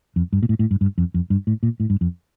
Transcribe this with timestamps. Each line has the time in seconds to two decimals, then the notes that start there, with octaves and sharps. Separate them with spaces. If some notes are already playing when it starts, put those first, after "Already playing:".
0.16 F2
0.33 G2
0.43 A#2
0.49 A2
0.59 A2
0.71 G2
0.81 G2
0.98 F2
1.14 F2
1.30 G2
1.47 A2
1.63 A#2
1.80 A2
1.90 G2
2.01 F2